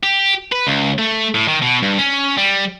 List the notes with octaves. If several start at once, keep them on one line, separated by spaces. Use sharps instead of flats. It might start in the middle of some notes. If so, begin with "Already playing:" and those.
G4
B4
C#2
A3
A2
D#3
B2
G2
C#4
G3